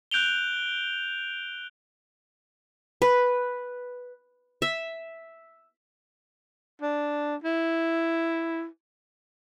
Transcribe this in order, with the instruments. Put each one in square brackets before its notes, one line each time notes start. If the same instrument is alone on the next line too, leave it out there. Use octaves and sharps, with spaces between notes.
[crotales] F#6 G6 D7 F7 G7
[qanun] B4
E5
[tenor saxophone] D4
E4